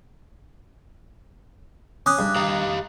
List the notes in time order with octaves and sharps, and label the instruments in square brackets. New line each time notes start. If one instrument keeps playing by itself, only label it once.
[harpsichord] C#4 [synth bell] D6 D#6 F#6
[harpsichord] G2
[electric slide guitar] G4 F5 A#5